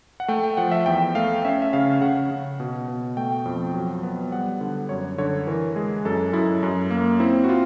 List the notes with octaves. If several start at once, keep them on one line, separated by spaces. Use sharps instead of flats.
F#5
A3 G5
G5
F3 F#5
E5
E2 G5
A3 F5
C#4 E5
E5
C#3 F5
C#3 F#5
C#3
B2
B2
A3 G5
F2
F#3
B3
G3 F#5
D3
F#2 C#5
D3 C#5
E3 A#4
G#3 G#4
F#2 A4
F#2 E4
F#2
A#3
C4 E4
F#4
F4